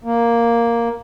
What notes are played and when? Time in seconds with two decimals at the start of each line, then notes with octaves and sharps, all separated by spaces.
0.04 A#3